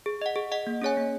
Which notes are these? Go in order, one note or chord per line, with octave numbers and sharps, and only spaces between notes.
G#4
D#5 F#5
G#4
D#5 F#5
A#3
C#4 G#4 C#5 G#5
A#3